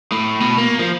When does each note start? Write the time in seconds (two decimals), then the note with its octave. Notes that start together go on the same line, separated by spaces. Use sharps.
0.12 A2
0.41 B2
0.58 A#3
0.79 F3